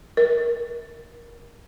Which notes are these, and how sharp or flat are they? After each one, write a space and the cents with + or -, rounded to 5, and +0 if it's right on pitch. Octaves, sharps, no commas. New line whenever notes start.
A#4 +15